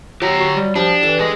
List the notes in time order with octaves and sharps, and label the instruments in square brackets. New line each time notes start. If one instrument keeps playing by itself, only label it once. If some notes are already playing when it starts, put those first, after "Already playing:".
[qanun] F#3 [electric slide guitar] G4 A#5
[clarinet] F#4
G3
[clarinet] F3 [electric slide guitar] D4 [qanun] G4
[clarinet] E3 [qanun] A4 A5
[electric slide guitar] G#4 D#5